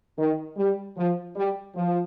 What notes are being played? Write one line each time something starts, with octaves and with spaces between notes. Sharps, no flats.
D#3
G3
F3
G3
F3